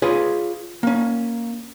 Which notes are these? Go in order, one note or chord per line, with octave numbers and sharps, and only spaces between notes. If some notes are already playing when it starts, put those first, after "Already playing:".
F4 G#4 B4 C#5
A#3 C#4